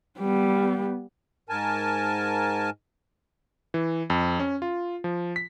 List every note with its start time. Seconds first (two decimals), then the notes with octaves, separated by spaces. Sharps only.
0.19 G3 B3
1.49 G#2 A#4 G#5 A5
3.74 E3
4.10 F2
4.39 C#4
4.62 F4
5.04 F3
5.36 B6